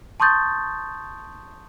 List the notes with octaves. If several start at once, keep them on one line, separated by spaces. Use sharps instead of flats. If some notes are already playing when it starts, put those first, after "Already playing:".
A5 C6 C#6 D#6 G6 A6